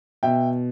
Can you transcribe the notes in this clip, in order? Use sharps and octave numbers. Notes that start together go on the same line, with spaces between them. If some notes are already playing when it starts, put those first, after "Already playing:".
B2 E5 G5